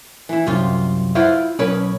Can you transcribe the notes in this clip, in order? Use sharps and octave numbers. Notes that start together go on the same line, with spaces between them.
E3 E4
C2 F#2 F4
E4 F4 B4 C5 F5 F#5
B1 C#4 A#4 B4 C#5